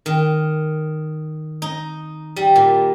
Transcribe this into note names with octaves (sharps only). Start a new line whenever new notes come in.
D#3
D#4
G3
A#2